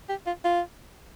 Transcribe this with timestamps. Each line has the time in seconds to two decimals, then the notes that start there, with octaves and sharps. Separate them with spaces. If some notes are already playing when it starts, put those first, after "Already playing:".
0.09 G4
0.26 F4
0.44 F4